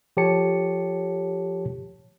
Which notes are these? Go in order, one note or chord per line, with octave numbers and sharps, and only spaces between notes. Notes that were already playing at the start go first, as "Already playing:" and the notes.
F3 G4 A4 C#5 A5 C#7